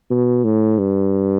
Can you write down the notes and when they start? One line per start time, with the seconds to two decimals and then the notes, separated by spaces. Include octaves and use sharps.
0.11 B2
0.44 A2
0.78 G2